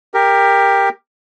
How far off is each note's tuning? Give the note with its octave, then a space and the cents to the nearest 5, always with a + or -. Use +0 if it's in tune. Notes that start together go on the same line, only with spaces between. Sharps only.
G4 +15 A#4 +0